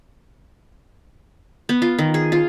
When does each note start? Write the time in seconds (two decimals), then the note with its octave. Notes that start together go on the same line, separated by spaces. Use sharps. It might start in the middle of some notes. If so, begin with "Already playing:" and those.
1.69 B3
1.82 F4
1.99 D#3
2.14 G#4
2.32 F4